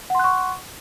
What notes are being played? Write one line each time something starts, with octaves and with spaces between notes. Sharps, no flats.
F#5 C6 C#6 F#6